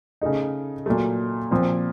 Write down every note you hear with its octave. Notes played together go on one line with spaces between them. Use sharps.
C#3 A3 D#4
A#2 F#3 A3
A#2 F3 C4